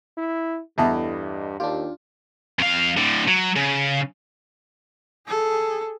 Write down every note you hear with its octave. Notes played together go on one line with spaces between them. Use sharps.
E4
E2 G2 E4 A4 D#5 E5 A5 A#5
D#2 D4 F4 G4
F2 F5
A2 D3
F#3
C#3
G#4 A4